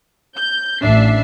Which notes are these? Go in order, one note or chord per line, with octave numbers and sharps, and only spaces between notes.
G6
A1 D4 E5 C7